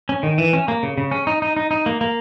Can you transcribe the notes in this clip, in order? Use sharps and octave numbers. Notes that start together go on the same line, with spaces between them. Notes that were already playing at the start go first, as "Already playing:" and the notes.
C#4
D#3
E3
C#4
A#3
C#3
C#3
C#4
D#4
D#4
D#4
D#4
A#3
A#3